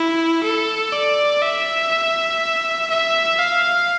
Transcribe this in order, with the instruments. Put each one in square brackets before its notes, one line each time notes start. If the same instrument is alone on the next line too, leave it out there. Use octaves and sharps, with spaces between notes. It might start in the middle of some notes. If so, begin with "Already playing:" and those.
Already playing: [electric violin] E4
A4
D5
E5
E5
F5